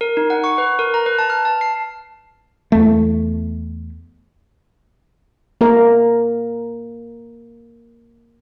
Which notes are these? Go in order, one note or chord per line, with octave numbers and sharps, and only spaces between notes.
A#4
D#4
F#5
C#6
B4
A#4
A#5
B4
A5
F6
A5
C7
E2 A3
A#3 A#4